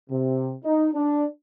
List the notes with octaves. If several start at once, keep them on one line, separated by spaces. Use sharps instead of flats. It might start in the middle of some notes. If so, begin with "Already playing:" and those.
C3
D#4
D4